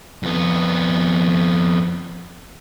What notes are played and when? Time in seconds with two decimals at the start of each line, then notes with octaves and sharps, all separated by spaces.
0.23 F2 B3